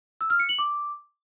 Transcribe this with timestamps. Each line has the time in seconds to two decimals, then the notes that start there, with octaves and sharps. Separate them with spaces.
0.21 E6
0.30 F6
0.40 C#7
0.49 F#7
0.59 D6